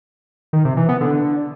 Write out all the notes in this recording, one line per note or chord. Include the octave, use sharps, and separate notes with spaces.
D#3
C3
E3
B3
D3